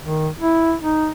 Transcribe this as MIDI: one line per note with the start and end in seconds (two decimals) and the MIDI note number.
0.02 0.28 51
0.39 0.74 64
0.80 1.10 63